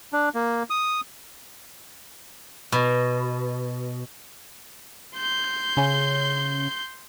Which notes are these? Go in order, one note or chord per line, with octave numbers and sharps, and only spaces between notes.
D4
A#3
D#6
B2
C6 G6
C#3 C#4